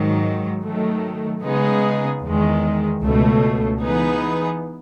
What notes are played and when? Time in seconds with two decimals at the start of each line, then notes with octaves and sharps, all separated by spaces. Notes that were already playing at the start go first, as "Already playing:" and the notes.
Already playing: G#2 D#3 F#3
0.63 D#3 F#3 A3
1.43 C#3 G#3 B3 D#4 G#4
2.22 E2 D#3 G#3
3.02 C#2 B2 A3
3.81 E3 B3 D#4 G#4 B4